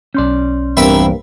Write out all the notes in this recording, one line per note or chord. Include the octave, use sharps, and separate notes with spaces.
B1 C#4 D5 C6 G6
E2 G2 A#3 C4 A#4 E5 B5